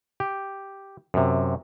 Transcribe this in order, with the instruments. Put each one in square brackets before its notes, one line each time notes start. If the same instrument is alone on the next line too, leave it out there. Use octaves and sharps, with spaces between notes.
[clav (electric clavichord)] G4
F#2 C3